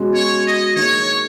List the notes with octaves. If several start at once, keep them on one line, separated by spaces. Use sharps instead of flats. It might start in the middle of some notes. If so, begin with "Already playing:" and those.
Already playing: B2 G#3 C#4 F#4
C#5
D#5
D#3 A#3 D#4 G#4 C#5